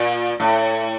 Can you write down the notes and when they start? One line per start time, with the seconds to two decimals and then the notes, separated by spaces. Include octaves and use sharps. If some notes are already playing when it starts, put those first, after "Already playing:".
Already playing: A#2
0.40 A2